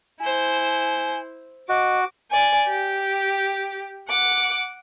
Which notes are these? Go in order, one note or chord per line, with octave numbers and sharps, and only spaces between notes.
E4 C5 G#5
F#4 D#5 D6
D5 G#5
G4
F#5 D6